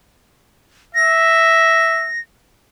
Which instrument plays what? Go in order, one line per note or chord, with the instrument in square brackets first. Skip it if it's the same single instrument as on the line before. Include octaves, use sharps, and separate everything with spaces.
[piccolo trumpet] E5 [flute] A#6